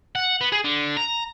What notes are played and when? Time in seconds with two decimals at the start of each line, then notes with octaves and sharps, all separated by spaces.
0.15 F#5
0.41 B3
0.52 G#4
0.64 D3
0.97 A#5